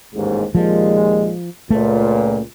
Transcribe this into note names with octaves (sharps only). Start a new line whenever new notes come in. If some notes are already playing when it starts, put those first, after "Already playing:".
A1 D#2 G#2
D#2 A#2 F3 G#3
C#2 A#2 A3